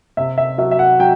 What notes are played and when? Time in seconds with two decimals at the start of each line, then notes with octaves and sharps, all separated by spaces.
0.17 C3 E5
0.38 E5
0.58 F#3 E5
0.71 E5
0.79 F#5
0.99 F#3 G5